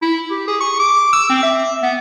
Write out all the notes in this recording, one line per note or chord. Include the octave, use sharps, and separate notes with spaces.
E4
G4
G#4
C#6
D6
E6
C4
E5
B3